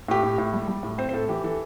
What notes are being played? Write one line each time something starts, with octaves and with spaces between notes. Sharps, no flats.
A2 G4
A2
A2
G3
G3
A2
C4 C5
C5
A2 A4
E3 G4
E3 A4